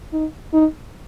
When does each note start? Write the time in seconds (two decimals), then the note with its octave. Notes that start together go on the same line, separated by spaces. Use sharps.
0.13 D#4
0.53 D#4